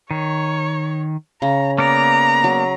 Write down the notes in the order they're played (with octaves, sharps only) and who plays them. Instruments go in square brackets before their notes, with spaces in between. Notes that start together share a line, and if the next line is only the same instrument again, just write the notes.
[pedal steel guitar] D#3 [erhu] C#5
[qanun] C#3 [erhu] A#5
[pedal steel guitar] A#3 B3 D5 [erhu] A#5
[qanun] F#3